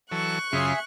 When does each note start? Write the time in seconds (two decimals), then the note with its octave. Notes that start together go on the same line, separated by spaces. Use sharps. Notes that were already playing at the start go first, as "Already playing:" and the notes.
0.11 E3 F#3 A4 C#6 F#6
0.53 F#2 C#3 C#4 F4 G#4 E5 C6